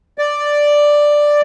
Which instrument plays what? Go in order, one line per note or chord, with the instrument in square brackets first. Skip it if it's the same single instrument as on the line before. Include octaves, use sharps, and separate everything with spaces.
[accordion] D5